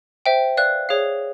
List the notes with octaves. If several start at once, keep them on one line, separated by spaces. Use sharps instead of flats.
C5 E5 G5
B4 D5 F5 F#6
G#4 C#5 F5